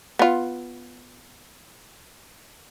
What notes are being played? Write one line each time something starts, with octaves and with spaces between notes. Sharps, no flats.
B3 F4